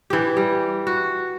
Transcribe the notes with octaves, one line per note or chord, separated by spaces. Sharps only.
E3 G4
G3
F#4